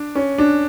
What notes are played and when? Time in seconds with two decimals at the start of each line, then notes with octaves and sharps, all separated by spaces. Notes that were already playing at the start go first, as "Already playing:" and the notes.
Already playing: D4
0.15 C#4
0.38 D4